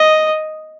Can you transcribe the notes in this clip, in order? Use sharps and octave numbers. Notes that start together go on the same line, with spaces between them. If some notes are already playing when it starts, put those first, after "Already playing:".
Already playing: D#5